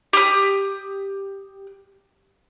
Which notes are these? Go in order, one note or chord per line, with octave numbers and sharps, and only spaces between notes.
G4 D#6